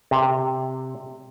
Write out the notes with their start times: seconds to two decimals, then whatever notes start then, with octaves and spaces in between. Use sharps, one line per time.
0.11 C3